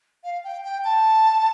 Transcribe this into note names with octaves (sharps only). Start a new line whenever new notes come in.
F5
G5
G5
A5